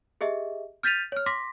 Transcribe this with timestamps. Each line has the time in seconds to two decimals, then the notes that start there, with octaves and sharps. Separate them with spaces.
0.21 G4 G#4 D#5 E5
0.83 F6 G6 A6 B6 D#7 F7
1.12 C#5 F6
1.26 C6 D6 A#6 B6